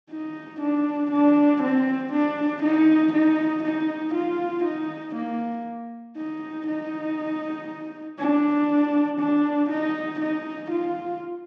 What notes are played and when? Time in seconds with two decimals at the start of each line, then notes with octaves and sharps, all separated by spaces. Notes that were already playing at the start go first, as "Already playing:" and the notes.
0.11 D#4
0.61 D4
1.11 D4
1.62 C4
2.12 D4
2.63 D#4
3.13 D#4
3.64 D#4
4.15 F4
4.65 D#4
5.15 A#3
6.17 D#4
6.67 D#4
8.18 D4
9.19 D4
9.70 D#4
10.20 D#4
10.71 F4